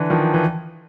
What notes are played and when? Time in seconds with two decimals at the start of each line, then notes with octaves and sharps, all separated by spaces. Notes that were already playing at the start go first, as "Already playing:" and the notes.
Already playing: D3 E3
0.10 D#3 F3
0.34 E3